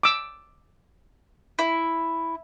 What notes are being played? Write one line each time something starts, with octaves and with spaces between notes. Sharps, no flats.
D6 E6
E4